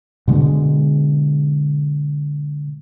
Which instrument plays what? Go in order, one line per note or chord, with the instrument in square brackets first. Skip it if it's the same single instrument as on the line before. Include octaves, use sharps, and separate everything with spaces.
[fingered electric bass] B2 D3 G#3